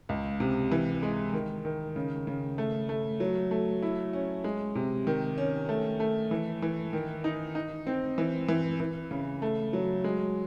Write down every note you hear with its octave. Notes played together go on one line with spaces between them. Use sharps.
C#2
C3
E3
G#3
D#3
D#3
C#3
C#3
A3
A3
F#3
A3
E4
C#4
G#3
C3
D#3
C#4
A3
A3
E3
E3
D#3
D#4
D#4
C4
E3
E3
E3
C#3
A3
F#3
G#3